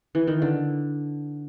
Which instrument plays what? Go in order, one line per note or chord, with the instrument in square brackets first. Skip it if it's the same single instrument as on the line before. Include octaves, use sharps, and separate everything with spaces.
[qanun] E3
D#3
D3